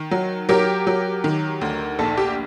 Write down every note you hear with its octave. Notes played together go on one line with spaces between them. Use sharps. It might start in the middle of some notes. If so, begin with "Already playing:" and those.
Already playing: D#3
F#3
F#3 G4 A#4
F#3
D#3
D2
A#1 A4
G4